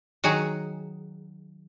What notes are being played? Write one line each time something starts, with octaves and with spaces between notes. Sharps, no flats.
D#3 F#3 F#4 G#4